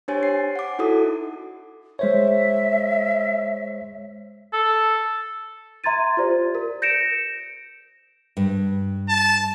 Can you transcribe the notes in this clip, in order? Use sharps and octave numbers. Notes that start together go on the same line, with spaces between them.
D4 G4 C5 C#5 G#5 A6
C7
F#5 D6
D#4 E4 F#4 A4 D#6
G#3 C5 C#5 E5
A4
E5 A#5 C6 G#6 A6 D#7
F4 G4 C5 D5
A#4
G6 A#6 C#7 D7 E7
G2
A5